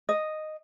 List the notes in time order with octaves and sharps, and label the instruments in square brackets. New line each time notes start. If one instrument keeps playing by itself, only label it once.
[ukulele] D#5